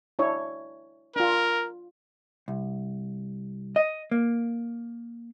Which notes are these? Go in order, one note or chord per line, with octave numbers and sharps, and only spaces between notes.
D4 E4 C#5
D4 F4 A#4
C2
D#5
A#3